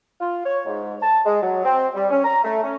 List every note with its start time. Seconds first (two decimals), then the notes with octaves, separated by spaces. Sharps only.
0.20 F4
0.44 C#5
0.66 G#2
1.02 A5
1.25 G#3
1.42 F#3
1.64 C4
1.94 G3
2.10 C#4
2.24 A#5
2.43 A3
2.63 C#4